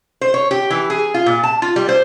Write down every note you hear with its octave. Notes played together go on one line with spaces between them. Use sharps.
C5
C#5
G4
E3
G#4
F4
A#2
A5
F4
G3
C5